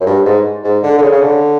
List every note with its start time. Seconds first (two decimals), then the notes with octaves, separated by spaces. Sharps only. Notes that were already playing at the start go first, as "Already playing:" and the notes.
0.01 F#2
0.06 G2
0.25 G#2
0.64 G#2
0.83 D3
0.98 D3
1.02 C#3
1.12 C#3
1.21 D3